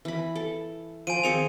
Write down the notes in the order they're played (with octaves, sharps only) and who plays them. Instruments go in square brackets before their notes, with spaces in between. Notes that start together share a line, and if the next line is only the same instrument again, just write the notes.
[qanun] E3 B5
A4
[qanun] F3 [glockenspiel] G#5 D7 D#7
[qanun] D#3 C4 G#4 [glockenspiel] C#7 F7